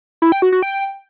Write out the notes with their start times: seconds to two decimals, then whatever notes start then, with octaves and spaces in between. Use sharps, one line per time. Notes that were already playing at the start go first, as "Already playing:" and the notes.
0.22 E4
0.32 G5
0.42 F#4
0.52 F#4
0.63 G5